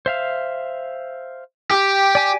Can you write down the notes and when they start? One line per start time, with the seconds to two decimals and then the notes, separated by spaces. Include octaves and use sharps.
0.06 C5 E5 F5
1.71 G4
2.15 D5 G#5 D6